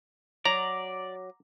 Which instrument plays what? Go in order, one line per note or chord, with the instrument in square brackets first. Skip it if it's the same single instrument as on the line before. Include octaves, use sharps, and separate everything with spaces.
[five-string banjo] F#3 [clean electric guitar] D5 [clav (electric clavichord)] A#5 [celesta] D6 A#6